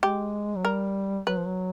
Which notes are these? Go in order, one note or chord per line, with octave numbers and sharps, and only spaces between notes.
G#3 G4
F#3
G3 A#4
F#3 B4
F3
F#3